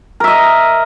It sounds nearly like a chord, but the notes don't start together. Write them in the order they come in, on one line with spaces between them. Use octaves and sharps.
A#4 E5 D#5